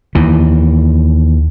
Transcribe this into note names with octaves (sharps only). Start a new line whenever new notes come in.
D#2 E3